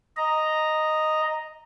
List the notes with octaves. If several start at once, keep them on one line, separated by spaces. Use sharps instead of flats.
D#5 A#5